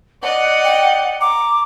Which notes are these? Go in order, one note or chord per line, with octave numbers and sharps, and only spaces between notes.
D5 D#5 F#5
G5
A#5 D6